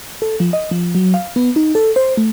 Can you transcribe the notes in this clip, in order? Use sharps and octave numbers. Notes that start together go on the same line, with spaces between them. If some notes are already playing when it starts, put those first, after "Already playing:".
A4
F3
D#5
F3
F#3
F5
B3
D#4
A4
C5
A3